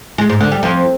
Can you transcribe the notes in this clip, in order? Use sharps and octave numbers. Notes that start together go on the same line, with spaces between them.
G#3
G#2
D3
G3
F2